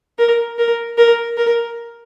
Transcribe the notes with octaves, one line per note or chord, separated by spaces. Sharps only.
A#4
A#4
A#4
A#4